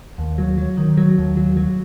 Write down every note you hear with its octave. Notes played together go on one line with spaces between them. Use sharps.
D#2
F#3
F#3
D#3
F#3
D#2
F#3
F#3